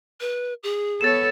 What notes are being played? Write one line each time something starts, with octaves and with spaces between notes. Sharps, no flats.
B4
G#4
B3 A4 C#5 A6 E7